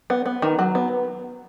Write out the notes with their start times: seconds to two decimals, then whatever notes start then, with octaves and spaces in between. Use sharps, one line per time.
0.10 B3
0.26 B3
0.42 D#3
0.59 F#3
0.75 B3